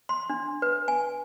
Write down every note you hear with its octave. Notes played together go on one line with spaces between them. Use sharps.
C6
D4
B4
G#5